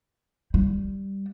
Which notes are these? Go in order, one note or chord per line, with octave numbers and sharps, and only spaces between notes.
G3